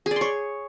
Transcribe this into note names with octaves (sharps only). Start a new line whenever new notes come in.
G#4
D5
C6
C#5